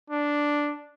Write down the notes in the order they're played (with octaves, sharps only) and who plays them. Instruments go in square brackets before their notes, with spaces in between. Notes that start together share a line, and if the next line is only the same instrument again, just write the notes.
[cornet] D4